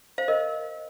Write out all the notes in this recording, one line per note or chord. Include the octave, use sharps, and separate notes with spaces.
C5 F5
A#4 D#5